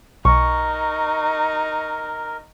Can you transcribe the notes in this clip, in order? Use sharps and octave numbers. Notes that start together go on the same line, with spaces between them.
B1 D#4 A#4 C#6